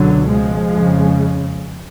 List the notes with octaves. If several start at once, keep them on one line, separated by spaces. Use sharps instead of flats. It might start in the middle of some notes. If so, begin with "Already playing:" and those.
Already playing: C#2 B2 D3 F#3
F3 G#3
F2 C#3